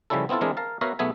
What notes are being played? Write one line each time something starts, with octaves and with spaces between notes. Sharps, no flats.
C#3 F3 G3 C#4 E4 A4
B3 C4 E4 F4 A4
E3 G#3 C4 D4 G#4 A#4
A#4 F5 A5
B3 F#4 A#4 C#5 E5 F5
B1 A3 B3 G#4 E5 G#5